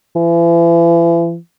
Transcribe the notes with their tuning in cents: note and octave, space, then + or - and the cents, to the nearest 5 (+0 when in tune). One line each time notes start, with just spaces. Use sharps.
E3 +40